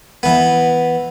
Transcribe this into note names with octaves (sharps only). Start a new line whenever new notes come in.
E3 B3